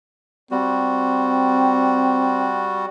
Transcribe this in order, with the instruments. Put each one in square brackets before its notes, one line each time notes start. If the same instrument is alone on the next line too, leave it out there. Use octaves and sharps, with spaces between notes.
[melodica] G3 F#4 [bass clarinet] C4